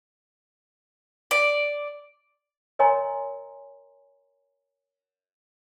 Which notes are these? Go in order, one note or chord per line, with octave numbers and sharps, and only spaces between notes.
D5
A#4 C#5 D#5 G#5 A#5 C6